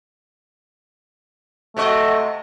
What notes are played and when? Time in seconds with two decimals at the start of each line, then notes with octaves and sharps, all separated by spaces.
1.77 C3 A3 F#4 D#5